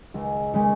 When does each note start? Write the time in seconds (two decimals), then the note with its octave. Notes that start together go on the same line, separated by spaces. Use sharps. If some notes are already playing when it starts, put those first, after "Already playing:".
0.14 C#2
0.54 C#3 G#3 C#4